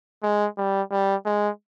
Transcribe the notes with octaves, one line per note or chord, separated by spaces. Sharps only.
G#3
G3
G3
G#3